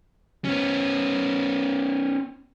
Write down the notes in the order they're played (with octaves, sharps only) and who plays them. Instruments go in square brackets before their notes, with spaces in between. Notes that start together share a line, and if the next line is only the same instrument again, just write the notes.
[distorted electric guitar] B3 C#4